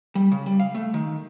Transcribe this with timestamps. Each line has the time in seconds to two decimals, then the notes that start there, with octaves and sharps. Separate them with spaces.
0.15 G3
0.32 C#3
0.46 G3
0.60 F5
0.74 A3
0.94 D#3